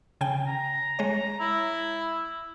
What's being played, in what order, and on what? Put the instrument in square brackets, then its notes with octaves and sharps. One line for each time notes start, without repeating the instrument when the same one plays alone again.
[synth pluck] C#3 G5 G#5
[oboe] A#5
[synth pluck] G#3 C#5
[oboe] E4